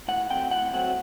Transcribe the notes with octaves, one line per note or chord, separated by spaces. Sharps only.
A2 F#5
F#3 A3 C4 G5
A2 F#5
F#3 A3 C4